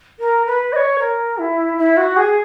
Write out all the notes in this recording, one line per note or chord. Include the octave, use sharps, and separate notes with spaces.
A#4
B4
D#5
C#5
A#4
E4
E4
F#4
G#4